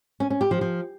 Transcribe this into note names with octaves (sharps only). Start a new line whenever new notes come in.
C#4
C#4
G4
F3
F3